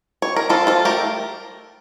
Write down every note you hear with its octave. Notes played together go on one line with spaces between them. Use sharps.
C#5
A#4
F3 F4 A4
F4 A4
A3 G4 A#4